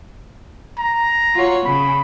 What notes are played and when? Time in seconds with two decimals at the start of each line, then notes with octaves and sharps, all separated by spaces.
0.79 A#5
1.35 F4 F#4 C#5
1.65 C#3 B5